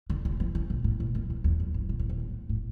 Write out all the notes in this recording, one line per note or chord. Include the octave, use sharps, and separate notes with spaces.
D3
C3
E3
D3
B2
A2
B2
F#2
F#2
E2
F#2
G2
B2
C3
B2
A2
A2